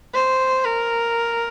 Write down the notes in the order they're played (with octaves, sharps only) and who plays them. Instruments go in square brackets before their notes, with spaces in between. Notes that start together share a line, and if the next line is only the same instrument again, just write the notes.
[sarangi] C5
A#4